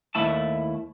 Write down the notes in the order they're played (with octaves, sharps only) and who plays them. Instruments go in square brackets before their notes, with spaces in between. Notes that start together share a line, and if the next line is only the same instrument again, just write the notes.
[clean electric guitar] D#2 A3 E4 A5